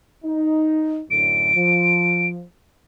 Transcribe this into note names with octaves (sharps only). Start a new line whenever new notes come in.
D#4
F#2 A2 D3 D7
F3